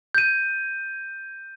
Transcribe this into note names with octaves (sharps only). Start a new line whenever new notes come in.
G6 D#7